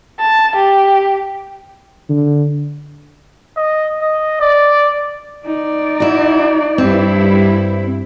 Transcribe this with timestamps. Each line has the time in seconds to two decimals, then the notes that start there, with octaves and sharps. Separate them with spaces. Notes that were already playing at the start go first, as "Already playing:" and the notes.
0.20 A5
0.56 G4
2.09 D3
3.57 D#5
4.02 D#5
4.41 D5
5.46 D#4 D5
6.00 E4 F#4
6.78 G2 C4 E4